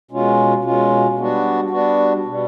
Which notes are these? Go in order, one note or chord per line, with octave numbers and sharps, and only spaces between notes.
B2 G#3 C#4 F4
B2 G#3 C#4 F4
G3 B3 D4 F#4
G3 B3 D4 F#4
B2 G3